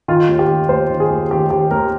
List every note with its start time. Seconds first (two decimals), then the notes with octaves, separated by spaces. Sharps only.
0.08 D#3 F4
0.29 D#2
0.39 G4
0.49 D#3
0.69 D#2 C5
0.90 D#3
1.00 G#4
1.10 D#2
1.31 D#3 G4
1.51 D#3 G4
1.71 D#2 A#4